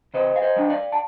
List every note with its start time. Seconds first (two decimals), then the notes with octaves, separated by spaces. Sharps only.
0.14 C3 C5 D#5
0.36 F5
0.42 C5 D#5
0.56 G3 D4
0.70 D5 F5
0.92 A5